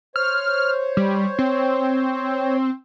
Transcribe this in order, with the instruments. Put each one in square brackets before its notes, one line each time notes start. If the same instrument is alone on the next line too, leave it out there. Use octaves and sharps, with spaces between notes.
[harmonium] C5 C#5 [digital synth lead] F6
[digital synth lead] G3
C4